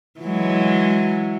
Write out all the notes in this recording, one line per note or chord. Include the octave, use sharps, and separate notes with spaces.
E3 F#3 G#3